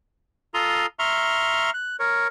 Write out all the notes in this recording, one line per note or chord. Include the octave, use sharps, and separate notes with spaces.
F4 A4 A#5 C6 D#6
E5 A#5 C6 C#6 F6
F#6
A#4 C#5